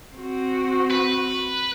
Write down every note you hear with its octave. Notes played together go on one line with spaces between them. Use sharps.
C4 F#4
B4